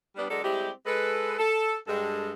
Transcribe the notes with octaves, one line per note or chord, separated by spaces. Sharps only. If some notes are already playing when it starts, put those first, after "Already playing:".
G3 B3 D4
D3 F#3 G#3 A4 A#4 D5
G3 G#3 C4 E4 G4
G#3 A4 B4
A4
G2 G#3 A4